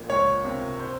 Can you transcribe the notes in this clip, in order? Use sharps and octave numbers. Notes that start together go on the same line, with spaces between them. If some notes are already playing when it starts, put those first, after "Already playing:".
Already playing: A#1 A#2
C#2 C#5
C3
C5